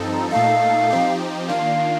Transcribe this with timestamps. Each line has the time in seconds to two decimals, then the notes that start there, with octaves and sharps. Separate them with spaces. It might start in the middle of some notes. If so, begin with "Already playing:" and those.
Already playing: G2 F3 C4 D#4 A4
0.12 A#5
0.31 A#2 A3 D#4 A4 F5
0.90 F3 C4 D#4 G4
1.48 D#3 A#3 D4 F4 F5